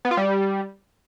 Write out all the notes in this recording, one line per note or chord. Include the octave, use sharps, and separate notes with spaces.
B3
F4
G3